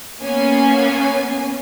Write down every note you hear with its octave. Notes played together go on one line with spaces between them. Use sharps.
A#3 B3 C#4 G#5